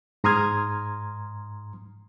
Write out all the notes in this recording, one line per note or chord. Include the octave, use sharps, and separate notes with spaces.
G#2 A#5 C6 D#6 F6 G#6